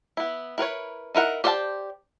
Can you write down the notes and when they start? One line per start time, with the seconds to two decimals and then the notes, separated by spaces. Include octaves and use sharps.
0.17 B3 E4
0.58 E4 A#4 B4 C#5
1.15 D#4 E4 A#4 F#5
1.44 G4 C5 D5 F5 A5